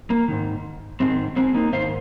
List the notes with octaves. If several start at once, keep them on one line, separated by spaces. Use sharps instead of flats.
A#3
G#2 D#3
G#2 D#3 G#3 C4
G#3 C4
A#3 D#4
G#2 D#3 C5 F5